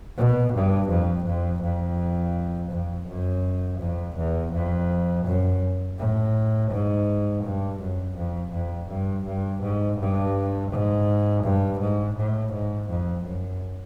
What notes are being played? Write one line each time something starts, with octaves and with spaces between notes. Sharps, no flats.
B2
G2
F2
F2
F2
F2
F#2
F2
E2
F2
F#2
A2
G#2
G2
F#2
F2
F2
G2
G2
G#2
G2
G#2
G2
G#2
A2
G#2
F2
F#2